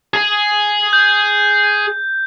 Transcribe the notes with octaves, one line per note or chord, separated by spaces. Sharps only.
G#4
G6